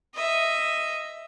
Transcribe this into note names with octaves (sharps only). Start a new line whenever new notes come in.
D#5 E5